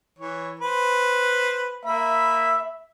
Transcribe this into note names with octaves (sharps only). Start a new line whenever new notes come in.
E3 C#5
B4 C5
A#3 E5 B5